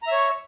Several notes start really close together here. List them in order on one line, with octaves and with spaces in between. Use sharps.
A#5 E5 C#5 C#6